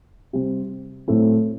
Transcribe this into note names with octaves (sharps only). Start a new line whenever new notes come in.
C3 G3 C4
A2 F#3 A3 C4 E4